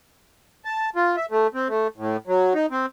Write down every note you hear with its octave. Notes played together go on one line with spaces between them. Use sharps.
A5
F4
E5
A3
C4
A3
A2
F#3
D#4
C4